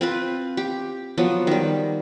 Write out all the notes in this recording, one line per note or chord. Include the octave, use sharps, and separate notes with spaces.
C4 F4 B4
G4
F3 F#3 B3
D#3 G3